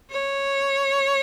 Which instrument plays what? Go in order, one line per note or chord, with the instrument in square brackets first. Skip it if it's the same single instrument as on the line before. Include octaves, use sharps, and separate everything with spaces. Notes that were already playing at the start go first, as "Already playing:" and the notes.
[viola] C#5